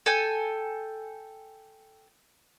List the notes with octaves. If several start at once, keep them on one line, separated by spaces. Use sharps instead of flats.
A4 G5 G#5